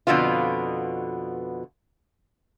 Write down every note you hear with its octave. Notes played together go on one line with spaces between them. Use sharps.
F2 B2 D3 B3 F4